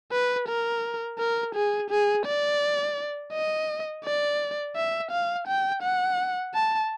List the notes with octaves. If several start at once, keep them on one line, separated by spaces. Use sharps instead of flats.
B4
A#4
A#4
G#4
G#4
D5
D#5
D5
E5
F5
G5
F#5
A5